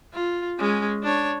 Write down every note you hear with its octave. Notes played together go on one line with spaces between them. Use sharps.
F4
G#3 C#4
D4 C#5